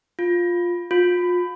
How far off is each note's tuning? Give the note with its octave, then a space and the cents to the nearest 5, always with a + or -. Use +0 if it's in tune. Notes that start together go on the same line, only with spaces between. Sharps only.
F4 +5
F4 +35